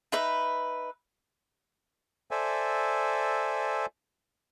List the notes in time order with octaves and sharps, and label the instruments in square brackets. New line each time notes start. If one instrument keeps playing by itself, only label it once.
[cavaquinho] D#4 B4 E5
[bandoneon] A4 C5 D5 E5 G#5